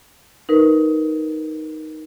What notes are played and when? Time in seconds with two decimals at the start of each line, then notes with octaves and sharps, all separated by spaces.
0.49 D#4 A#4 B4